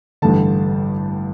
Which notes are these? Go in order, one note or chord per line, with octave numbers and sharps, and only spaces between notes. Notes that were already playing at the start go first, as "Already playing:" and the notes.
A1 G2 D3 A5